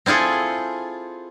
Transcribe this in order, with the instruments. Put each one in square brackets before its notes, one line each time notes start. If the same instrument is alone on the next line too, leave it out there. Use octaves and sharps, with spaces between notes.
[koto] C4 E4 F4 G#4 A4